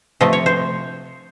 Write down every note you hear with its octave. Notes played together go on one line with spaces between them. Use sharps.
C3 F3 A3 D#5
C#5
C5